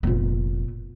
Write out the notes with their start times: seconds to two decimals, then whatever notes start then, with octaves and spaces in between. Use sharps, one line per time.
0.03 F1 A#2 B3